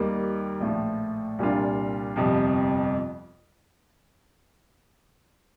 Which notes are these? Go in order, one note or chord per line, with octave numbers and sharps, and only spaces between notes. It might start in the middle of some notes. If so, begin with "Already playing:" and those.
Already playing: D#2 D#3 G3 A#3
A#1 A2 F3
C2 A#2 G3 D4 F4
G1 F2 C3 F3